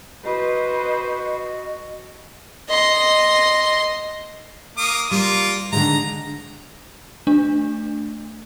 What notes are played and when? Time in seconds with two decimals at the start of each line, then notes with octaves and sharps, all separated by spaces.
0.25 F#4 B4 C5 D#5
2.69 D#5 C6
4.78 A#3 D#6
5.11 G3 A#3 F4
5.73 D3 D#3 G#3 A#5
7.27 A3 D4